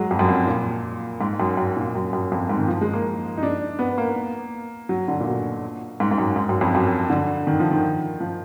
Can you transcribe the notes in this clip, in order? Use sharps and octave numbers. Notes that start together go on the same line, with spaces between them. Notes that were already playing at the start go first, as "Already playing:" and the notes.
Already playing: F#3 G#3
F2
F#2
F2
A#2
G#2
F#2
F#2
A#2
F#2
F#2
F2
G#2
D#3
F3
G#3
A#3
D#4
D4
B3
A#3
F#3
D3
A#2
B2
G#2
G#2
F#2
G#2
F#2
F2
F#2
D3
D#3
F3
D#3
F3